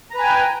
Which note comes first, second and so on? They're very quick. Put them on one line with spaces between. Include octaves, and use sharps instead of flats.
A#5 B4 G#5 G5